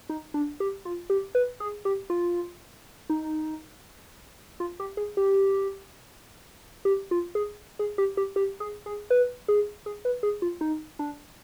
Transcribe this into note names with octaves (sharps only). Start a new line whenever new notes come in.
D#4
D4
G4
F4
G4
B4
G#4
G4
F4
D#4
F4
G4
G#4
G4
G4
F4
G#4
G#4
G4
G4
G4
G#4
G#4
B4
G#4
G#4
B4
G#4
F4
D#4
D4